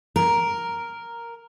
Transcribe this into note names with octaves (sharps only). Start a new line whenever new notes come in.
A#4